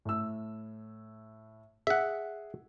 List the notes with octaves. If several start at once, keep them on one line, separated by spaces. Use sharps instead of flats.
A2 E6
G#4 E5 F#5